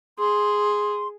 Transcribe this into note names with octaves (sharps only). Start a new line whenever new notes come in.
G#4 C6